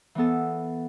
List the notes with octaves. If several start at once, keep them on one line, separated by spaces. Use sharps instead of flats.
E3 B3 A4